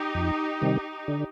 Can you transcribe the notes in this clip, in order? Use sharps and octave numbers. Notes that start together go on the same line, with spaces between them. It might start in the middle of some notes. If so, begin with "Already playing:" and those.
Already playing: D#4 G4
F2
C3 D#3 G3
D3